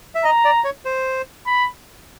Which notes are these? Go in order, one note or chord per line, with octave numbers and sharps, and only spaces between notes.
E5
D#5 A#5
D5
C#5
C5
B5